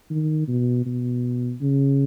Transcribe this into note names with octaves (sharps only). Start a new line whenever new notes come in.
D#3
B2
B2
C#3